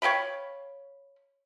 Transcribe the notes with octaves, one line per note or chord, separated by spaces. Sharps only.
C#5 F5 G5 B5